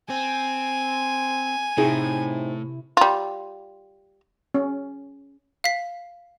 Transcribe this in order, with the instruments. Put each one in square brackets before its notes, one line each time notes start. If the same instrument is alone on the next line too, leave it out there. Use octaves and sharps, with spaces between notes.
[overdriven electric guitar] C4 [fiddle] G#5
[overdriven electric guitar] A2 [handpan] C3 E4 [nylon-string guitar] C4 D#4 G#4
[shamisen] G3 F4
[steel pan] C#4
[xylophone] F5 B6